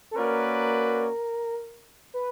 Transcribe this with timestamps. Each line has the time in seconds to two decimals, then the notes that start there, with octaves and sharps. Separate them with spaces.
0.11 A4
0.16 A#3 C#4 F#4 A#4 B4 D5
2.14 B4